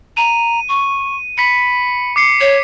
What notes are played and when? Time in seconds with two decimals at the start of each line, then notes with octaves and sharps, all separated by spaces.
0.17 A#5 D#7
0.69 C#6
1.38 B5 B6 C#7
2.16 D6 C7 C#7
2.41 C#5